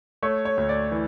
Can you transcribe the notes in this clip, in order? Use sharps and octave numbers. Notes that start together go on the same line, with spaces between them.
A3 C#5
C#5
D2
D5
E3